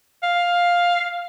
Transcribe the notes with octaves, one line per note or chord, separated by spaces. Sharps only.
F5